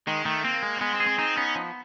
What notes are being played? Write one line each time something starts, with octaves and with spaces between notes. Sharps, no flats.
D#3 G#3
D#3 A3
A#3 C4
G#3
C4
G#3 B3
C4
G#4
C4
C4 D#4
B3 C#4
F3